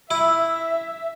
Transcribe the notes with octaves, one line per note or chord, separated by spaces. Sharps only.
E4 E5